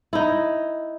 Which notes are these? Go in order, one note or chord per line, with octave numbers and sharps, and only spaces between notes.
D#4 E4